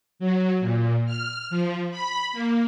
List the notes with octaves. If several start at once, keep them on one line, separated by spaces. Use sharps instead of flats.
F#3
A#2
F6
F3
B5
A#3